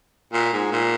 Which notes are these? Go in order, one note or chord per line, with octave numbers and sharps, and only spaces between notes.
A#2
G#2
A#2